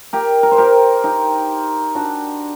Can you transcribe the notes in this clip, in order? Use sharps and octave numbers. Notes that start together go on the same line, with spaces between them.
G4 A#4
A#4
C5
G4 A#4
D#4 G4
D4 F#4